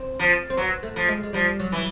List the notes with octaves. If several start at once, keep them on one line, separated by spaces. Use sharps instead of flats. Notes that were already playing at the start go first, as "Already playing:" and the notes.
Already playing: C4
F3
C4
F#3 B3
A3
F3
G#3
G#3
F3 G3
F#3
E3